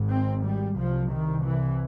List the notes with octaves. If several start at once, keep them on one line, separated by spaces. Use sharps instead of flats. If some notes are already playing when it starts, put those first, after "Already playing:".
Already playing: G#1 G#2
C4
G3
C2 C3 F3
D#3
E3